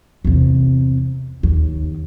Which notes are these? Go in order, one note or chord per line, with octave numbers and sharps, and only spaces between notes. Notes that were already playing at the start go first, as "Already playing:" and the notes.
E2 C3
D#2